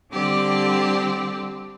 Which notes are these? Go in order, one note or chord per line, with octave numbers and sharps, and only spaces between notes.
D3 G3 C4 G4 D5